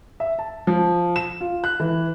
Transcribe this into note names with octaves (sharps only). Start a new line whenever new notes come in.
E5
A5
F3
E7
F4
F#6
E3